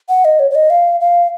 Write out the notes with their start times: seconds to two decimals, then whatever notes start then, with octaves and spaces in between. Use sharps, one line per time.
0.09 F#5
0.25 D#5
0.39 C#5
0.50 C#5
0.55 D#5
0.70 F5
1.00 F5